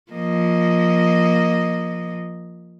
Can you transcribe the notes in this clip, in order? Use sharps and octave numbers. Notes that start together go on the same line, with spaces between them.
F3 A#3 D#5